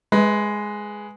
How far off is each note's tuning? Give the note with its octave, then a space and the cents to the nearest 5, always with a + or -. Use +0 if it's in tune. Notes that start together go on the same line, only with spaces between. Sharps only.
G#3 +0 B4 +0 E5 -45